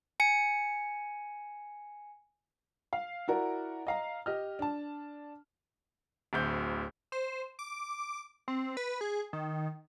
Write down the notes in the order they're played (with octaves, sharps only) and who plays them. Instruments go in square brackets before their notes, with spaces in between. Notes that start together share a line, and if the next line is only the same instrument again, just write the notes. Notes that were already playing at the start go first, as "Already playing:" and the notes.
[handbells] G#5 C#7
[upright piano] F5
E4 F#4 A#4 D5
D#5 F5 A#5
G4 D#5 F6
D4 A5
[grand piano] D1 D2 G6
[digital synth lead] C5
D6
C4
B4
G#4
D#3